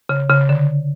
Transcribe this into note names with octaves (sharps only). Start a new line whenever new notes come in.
C#3
C#3
D3